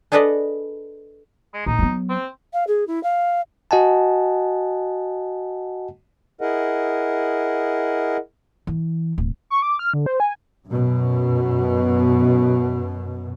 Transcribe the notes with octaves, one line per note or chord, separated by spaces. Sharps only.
D4 G#4 A4 B4 D5 D#5
G#3
A#1 D#4
F#3 B3
C4
F5
G#4
E4
F5
F#4 D#5 F#5 G#5 A5
E4 G#4 A#4 D#5 F#5
E3
D1
C#6
D6
F6
D3
C5
G#5
F#2 B2